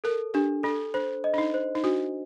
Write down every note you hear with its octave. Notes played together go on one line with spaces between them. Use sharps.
A4 A#4
D4 G4
D4 A4
D4 C5
D#5
D4
D#4
C5
D#4
D4 F#4